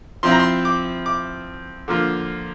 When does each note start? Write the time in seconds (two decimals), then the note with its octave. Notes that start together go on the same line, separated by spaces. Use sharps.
0.23 F3 C4 E4 C6
0.31 A#5
0.40 C6
0.65 D6
1.06 D6
1.88 D3 F3 A#3 F4